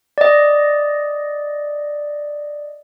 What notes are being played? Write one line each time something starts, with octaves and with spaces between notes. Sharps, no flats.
D5 D#5